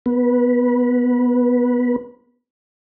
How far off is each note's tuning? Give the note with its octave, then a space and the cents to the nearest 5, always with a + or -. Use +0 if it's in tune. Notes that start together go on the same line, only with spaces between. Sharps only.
B3 +0 B4 -20